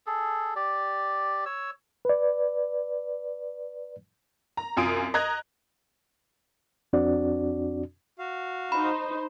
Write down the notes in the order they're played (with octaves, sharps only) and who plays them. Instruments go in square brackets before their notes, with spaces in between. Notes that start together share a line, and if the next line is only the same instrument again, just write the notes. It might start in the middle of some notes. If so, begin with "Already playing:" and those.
[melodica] G#4 A4
G4 D5
C#5 E6
[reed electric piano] B4 D5
[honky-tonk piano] A#5
C2 F#2 F4 G#5 D#6 D7
D#5 A#5 D#6 F#6 G#6
[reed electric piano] F2 C4 D4 F#4 D5
[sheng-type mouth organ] F#4 F5
[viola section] D#4 C5 [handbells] B5